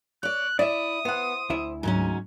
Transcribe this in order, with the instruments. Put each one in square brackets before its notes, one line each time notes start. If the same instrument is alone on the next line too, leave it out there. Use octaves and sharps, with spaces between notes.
[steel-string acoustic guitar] C#5 D5 [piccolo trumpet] F#6
[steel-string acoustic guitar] E4 [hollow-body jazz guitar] D5 E5 [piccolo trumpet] D#6
[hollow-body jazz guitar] B3 F#5 [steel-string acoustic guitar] C5
[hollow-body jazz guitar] D2 E4 E5
[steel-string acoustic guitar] G#2 F#3 C#4 [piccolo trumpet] G#5